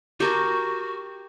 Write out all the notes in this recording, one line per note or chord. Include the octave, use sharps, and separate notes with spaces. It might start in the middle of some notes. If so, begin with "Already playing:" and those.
F#4 G4 A#4 A5